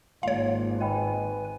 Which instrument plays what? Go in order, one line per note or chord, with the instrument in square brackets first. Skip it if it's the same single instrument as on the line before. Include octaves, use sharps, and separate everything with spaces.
[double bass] G#1 [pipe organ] G#3 A#3 F4 [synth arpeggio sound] C#5 F5
[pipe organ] B4 G#5 [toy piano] D#5 G5 B5